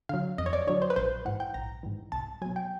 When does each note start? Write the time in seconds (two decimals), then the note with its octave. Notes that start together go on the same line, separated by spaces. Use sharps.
0.09 D3 F#3 F5
0.38 F2 D#5
0.46 C#5
0.53 D5
0.67 D3 F#3 C#5
0.82 C5
0.90 B4
0.96 A#1 C5
1.25 G#2 E3 F#5
1.40 G5
1.54 A#1 A#5
1.83 G#2 E3
2.12 C2 A5
2.42 B2 F#3 G#5
2.56 G5